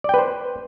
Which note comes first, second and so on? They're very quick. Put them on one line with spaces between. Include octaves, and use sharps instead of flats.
D5 G5 B4 C5